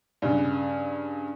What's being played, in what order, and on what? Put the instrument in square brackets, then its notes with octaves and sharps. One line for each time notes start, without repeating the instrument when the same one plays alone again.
[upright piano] G2 C#3